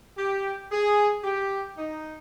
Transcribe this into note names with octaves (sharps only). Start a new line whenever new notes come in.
G4
G#4
G4
D#4